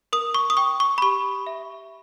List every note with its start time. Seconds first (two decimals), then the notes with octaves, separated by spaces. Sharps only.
0.13 A#4 D#6
0.35 C#6
0.50 D#6
0.57 G5 C#6
0.80 C#6
0.98 B5
1.02 G4 C#6
1.47 E5